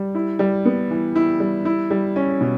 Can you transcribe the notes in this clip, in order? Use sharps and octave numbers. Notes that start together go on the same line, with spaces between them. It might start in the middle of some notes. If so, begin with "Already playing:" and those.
Already playing: G3
E4
G3
B3
E3
E4
G3
E4
G3
C#4
B2